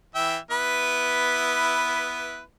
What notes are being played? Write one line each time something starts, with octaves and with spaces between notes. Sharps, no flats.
E3 E5 G5
B3 E4 B4